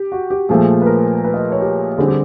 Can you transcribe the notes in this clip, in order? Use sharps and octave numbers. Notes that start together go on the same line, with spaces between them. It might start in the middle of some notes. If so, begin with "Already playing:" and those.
Already playing: G4
F#4
G4
A#2 F3 A3 G#4
B4
A#4
B4
D#5
C#5
G4
D3 G3 C4 G#4
G4